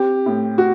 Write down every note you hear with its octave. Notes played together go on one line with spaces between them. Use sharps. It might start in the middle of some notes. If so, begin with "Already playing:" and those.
Already playing: C4 G4
A2
F#4